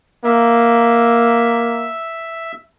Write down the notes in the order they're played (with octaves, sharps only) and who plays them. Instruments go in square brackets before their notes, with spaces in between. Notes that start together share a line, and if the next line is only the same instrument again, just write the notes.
[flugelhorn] A#3 [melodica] E5